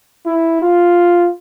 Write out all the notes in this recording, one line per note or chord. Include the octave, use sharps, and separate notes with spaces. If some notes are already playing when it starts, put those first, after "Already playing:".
E4
F4